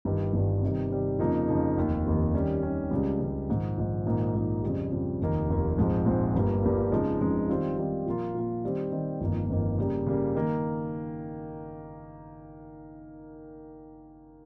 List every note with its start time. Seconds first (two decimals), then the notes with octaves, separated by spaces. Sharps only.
0.05 G1 G2 D#3 G3
0.33 G1 G2 D#3 G3
0.62 C3 D#3 G3
0.91 C3 D#3 G3
1.19 F2 C#3 F3 A#3 D#4
1.48 F2 C#3 F3 A#3 D#4
1.76 F1 D#2 D#3
2.05 F1 D#2 D#3
2.34 D#3 G3 C#4
2.63 D#3 G3 C#4
2.91 C#2 C#3 G3
3.20 C#2 C#3 G3
3.48 A#1 G#2 D#3
3.77 A#1 G#2 D#3
4.05 A#1 G#2 D#3 A#3 D#4
4.34 A#1 G#2 D#3 A#3 D#4
4.63 F2 C#3 G3
4.92 F2 C#3 G3
5.20 F1 D#2 D#3 A#3
5.48 F1 D#2 D#3 A#3
5.77 A#1 G#2 F3 G#3 C4
6.06 A#1 G#2 F3 G#3 C4
6.34 G1 G2 G3 A#3
6.63 G1 G2 G3 A#3
6.91 F2 C#3 F3 G#3 D#4
7.21 F2 C#3 F3 G#3 D#4
7.49 D#3 G3 C4 F4
7.77 D#3 G3 C4 F4
8.06 A#2 F3 A#3 F4
8.34 A#2 F3 A#3 F4
8.63 D#3 G3 C4
8.92 D#3 G3 C4
9.21 G1 F2 D#3 A#3
9.49 G1 F2 D#3 A#3
9.78 C#3 G3 A#3
10.06 C#3 G3 A#3
10.35 D#3 A#3